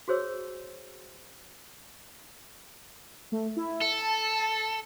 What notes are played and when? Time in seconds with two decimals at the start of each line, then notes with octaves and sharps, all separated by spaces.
0.08 F#4 G#4 C5 C#5 E6
3.32 A3
3.56 E4
3.81 A4
4.01 A5